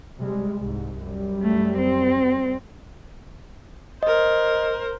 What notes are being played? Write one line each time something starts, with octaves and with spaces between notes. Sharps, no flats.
C3 G3 G#3
C2 G#2
F#2 G3
A3
C4
A#4 C5 D#5